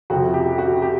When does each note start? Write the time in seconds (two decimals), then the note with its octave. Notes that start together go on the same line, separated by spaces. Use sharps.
0.10 F2 C3 F3 F#4
0.34 G4
0.58 F#4
0.82 G4